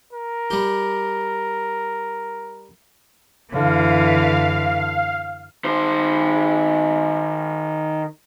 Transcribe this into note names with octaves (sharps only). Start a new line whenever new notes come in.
A#4
G3 G4
F#2 D3 E3 F5
D#3 C5